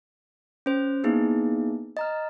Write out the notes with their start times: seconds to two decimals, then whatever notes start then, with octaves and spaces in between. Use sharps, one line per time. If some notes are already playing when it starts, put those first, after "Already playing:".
0.66 C#4 C5
1.04 A#3 B3 D#4 E4 G#4
1.97 D#5 A#5 F6